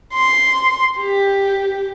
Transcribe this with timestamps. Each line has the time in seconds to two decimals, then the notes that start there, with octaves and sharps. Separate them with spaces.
0.14 C6
0.99 G4